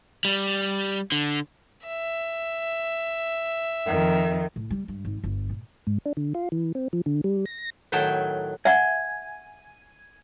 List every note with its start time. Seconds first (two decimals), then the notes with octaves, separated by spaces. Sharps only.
0.25 G3
1.12 D3
1.87 E5
3.86 F2 D#3
4.56 A2
4.70 G3
4.88 G2
5.05 G#1
5.24 G1
5.49 A#2
5.87 G#2
6.06 D4
6.17 D3
6.35 F4
6.52 E3
6.75 C4
6.93 F3
7.06 D3
7.24 G3
7.46 A#6
7.92 A2 D#3 F#3 G5 A5
8.65 E5 F#5 G#5